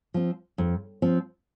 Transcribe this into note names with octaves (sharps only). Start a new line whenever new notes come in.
F3 C4
F2
F3 C4